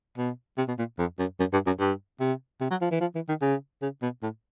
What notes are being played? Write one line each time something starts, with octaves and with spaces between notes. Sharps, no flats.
B2
C3
B2
A#2
F2
F#2
F#2
G2
F#2
G2
C3
C3
F#3
F3
E3
F3
E3
D#3
C#3
C#3
B2
A2